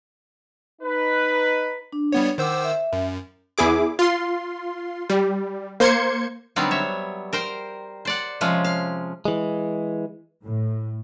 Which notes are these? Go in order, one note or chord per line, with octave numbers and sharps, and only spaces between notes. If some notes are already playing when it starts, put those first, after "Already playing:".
D#4 B4
D4
G3 B3 C#5
D#3 C5 F#5 D6 E6
E5
F#2
E2 E4 G#4 D6
F4 C6
G3
A#3 C5 C6 G#6 C#7
D3 F#3 G3 B3 C4 D#4
C#5 E5
A#4 C5 G5
C5 D5 F#5
C3 F3 G#3 C#4
F5
E3 G#3
A2